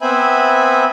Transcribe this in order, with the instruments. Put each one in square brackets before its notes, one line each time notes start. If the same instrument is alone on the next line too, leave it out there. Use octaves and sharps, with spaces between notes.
[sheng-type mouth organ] B3 C4 C5 E5 G#5 B5